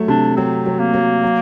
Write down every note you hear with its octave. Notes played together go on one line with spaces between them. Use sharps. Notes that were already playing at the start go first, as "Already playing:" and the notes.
Already playing: F#3 A3
C3 D4
F#3 C4
F#3
A#3
F#3
F#3